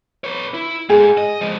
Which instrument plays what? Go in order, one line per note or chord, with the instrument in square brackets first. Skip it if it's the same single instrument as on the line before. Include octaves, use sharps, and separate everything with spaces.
[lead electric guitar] B4 C#5
E4
[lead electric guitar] G#2 [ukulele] G#4
[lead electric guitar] D#5
F3 G#3